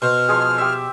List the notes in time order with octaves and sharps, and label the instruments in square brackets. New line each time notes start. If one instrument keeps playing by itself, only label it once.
[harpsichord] B2 [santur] C5 [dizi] F6
[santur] F3 G#3 G#4
G4 E5